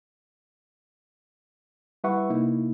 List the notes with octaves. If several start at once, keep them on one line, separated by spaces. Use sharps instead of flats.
G3 E4 B4 E5 F#5 C#6
C3 A#3 D#4 E4